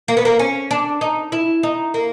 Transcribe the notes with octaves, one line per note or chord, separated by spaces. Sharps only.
A#3
B3
A#3
C#4
D4
D#4
E4
D#4
A#3